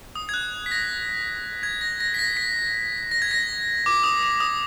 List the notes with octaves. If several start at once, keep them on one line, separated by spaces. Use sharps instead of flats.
D#6
G#6
F#6
B6
A#6
G#6
A#6
A#6
B6
A#6
B6
A#6
G#6
A#6
D6
D#6
D6
D#6